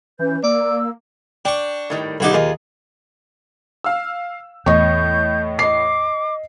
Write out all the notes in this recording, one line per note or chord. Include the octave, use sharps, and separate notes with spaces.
E3 C#4 B4 G6
A#3 D5 E6
D4 G5 C#6
A2 D#3 G3
B1 A2 D3 D#4 F#4 G4
D#2 F4 G#4 D#5
F5 E6
E2 A2 D#5 C#6 G6
D#5 D6 C7